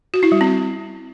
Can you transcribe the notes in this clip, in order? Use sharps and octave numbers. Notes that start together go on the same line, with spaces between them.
F#4
E4
G3
C4